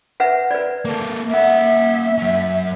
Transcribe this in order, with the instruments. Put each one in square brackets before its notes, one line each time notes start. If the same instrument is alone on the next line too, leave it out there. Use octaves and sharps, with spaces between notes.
[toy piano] B4 E5 F#5
B4 D5
[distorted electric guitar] A#3 A4
[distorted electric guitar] A#3 F#5 [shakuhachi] E5
[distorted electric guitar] F#3 C#4